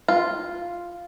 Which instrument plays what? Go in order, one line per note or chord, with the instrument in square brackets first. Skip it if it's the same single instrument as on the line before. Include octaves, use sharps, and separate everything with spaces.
[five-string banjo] F4